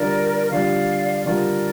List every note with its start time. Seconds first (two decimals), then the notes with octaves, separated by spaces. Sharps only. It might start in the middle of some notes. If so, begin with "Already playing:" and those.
Already playing: D3 G3 D4 F4 A#4 D5
0.51 D3 G3 D4 F4 D5 F5
1.25 D3 G3 D4 F4 A#4 D5